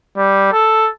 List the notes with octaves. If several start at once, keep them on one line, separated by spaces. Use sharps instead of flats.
G3
A4